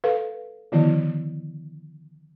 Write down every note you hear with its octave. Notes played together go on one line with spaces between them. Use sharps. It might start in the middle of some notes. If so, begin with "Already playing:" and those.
A4 B4 F5
D3 D#3 F3 B3 E4